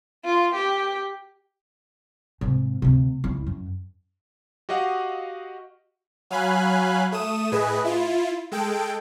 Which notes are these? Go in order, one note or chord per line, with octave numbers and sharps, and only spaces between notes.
F4
G4
G#2 C3
D2 C3
C#2 E4
F#2
F#4 G4 D#5 F5 F#5
F#3 F5 G#5 B5 F#6
A3 D#6 D#7 E7
A2 G#4 B4 D#5
E4 F4
G#3 A4 G5 D7